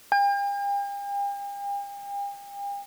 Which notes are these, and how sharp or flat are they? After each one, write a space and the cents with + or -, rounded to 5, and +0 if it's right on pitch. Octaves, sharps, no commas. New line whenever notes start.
G5 +45